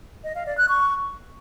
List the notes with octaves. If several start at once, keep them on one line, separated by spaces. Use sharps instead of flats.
D#5
F5
D5
F#6
C#6